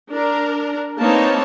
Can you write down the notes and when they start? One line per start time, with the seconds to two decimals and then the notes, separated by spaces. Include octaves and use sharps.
0.13 D4 A#4
1.01 A#3 C4 D#4 B4 C#5 A5